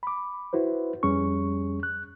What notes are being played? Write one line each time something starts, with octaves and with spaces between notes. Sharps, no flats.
B5 D6
E4 F#4 B4 C5
F2 G3 C#4 G#4 C#6
F#6